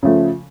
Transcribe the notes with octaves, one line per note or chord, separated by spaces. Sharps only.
C#3 F3 A3